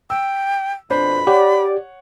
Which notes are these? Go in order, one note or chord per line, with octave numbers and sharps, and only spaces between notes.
G5 E6
F2 B2 D4 C5 B5
G4 C#5 D5 F#5